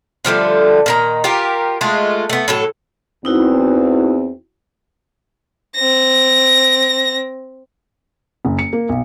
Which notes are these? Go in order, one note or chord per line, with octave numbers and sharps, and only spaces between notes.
D3 F3 G3 A3
A#2 D#3 A#5
F4 G4 A#4
G#3 A3 F4
A3 B3
A2 F#3 A4
E2 C4 D#4 E4 F#4
C4 A#6
F#1
C#7
A#3
B1